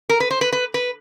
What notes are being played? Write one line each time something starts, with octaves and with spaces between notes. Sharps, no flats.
A#4
B4
C5
B4
B4
B4